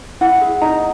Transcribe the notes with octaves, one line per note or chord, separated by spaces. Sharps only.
E4 F#5
G#4
D#4 A#5